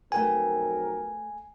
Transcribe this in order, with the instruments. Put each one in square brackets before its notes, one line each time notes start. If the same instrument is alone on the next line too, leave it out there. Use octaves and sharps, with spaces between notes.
[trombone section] B1 F2 A#4 [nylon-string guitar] A3 B4 G5 [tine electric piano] G#5